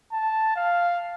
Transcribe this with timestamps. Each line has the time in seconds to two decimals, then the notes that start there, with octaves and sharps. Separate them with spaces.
0.12 A5
0.56 F5